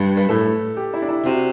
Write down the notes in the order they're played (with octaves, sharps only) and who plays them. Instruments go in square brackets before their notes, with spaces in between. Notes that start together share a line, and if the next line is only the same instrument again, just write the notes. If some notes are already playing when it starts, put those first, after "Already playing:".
Already playing: [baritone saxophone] G2 [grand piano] B4
[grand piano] B4
[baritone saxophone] A2 [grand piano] A4
[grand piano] G4
E4
D4
E4
[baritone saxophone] C3 [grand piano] F#4